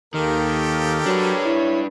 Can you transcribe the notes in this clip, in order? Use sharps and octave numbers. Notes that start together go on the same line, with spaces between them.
D#2 D#3 A#3 G4 A4 A#4
F#3 D4 B4 C#5
E4